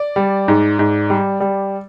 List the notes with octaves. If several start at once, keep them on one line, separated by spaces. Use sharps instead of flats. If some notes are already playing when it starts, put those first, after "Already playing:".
Already playing: D5
G3
G#2
G#2
G3
G3